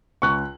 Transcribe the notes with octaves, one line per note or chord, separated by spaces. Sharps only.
C#2 C#6 F#6